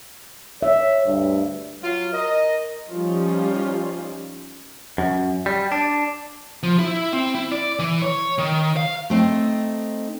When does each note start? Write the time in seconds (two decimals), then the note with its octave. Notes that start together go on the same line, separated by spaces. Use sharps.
0.63 C#5 E5
1.05 D2 G2
1.82 F#3 F4
2.13 A#4 D#5
2.92 F3 G3 C#4 D#4 F4
4.98 F#2
5.46 G3
5.72 D4
6.63 F3
6.79 E4
7.13 C4
7.35 E4
7.52 D5
7.79 E3
8.02 C#5
8.38 D#3
8.77 F5
9.10 A3 C4 D#4